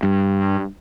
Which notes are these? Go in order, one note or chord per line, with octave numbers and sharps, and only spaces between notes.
G2